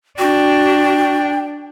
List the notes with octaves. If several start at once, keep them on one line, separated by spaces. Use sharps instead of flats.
D4 F#4 G5